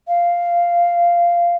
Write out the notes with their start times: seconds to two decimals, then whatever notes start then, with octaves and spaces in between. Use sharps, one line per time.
0.07 F5